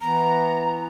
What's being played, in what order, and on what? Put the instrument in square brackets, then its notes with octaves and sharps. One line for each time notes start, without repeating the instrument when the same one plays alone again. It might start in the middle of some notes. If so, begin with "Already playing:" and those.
[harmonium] E3 B3 [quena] A#5